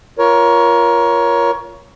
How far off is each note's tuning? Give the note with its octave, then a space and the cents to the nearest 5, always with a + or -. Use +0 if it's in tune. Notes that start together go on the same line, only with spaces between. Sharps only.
F4 -10 A#4 +25 C#5 +15